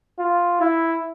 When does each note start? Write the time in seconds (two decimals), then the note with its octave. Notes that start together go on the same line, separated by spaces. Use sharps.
0.19 F4
0.61 E4